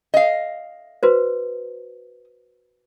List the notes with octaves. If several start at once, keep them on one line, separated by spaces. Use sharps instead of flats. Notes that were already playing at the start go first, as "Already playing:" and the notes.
D#5 F5
F#4 B4 C5